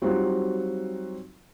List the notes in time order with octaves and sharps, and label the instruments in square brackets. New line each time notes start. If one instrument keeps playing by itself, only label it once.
[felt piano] F#3 G3 C4 D#4 F4 F#4